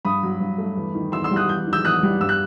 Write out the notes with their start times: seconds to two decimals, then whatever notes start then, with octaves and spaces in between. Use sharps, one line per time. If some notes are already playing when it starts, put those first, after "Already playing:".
0.05 G2 B5 D#6
0.23 F#3
0.40 G2
0.58 A3
0.77 E2
0.95 D#3
1.12 E2 C6 E6
1.24 C6 E6
1.31 G3
1.36 D#6 F#6
1.48 E2 G6
1.67 D#3
1.73 E6 G6
1.85 E2 D#6 F#6
2.03 G3
2.21 G2 E6
2.29 F#6